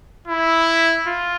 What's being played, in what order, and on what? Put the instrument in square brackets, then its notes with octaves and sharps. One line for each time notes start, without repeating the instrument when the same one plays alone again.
[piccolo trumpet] E4
F4